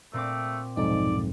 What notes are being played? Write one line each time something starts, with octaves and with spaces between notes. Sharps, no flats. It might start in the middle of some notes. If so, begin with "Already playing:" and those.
A#2 A3 C4 D6
B1 F2 G#2 D#4 D5